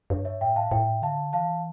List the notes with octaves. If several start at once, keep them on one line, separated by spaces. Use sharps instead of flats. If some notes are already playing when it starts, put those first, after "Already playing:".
G2 C#5
C#5 E5
A2 E5 G5
F5 A5
A2 E5 G5
D3 F5 A5
E3 F5 A5